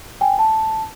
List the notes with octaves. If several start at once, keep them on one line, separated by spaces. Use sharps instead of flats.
G5 G#5
A5